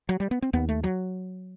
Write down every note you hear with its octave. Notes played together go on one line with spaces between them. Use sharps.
F#3
G3
B3
C4
D#2 B3
A3
F#3